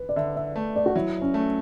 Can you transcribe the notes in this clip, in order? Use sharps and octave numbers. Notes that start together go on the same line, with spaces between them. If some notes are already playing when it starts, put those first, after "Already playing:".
Already playing: B4
D5
D3 E5
E5
A3
D5
F#4
F#3 E4
C#4
A3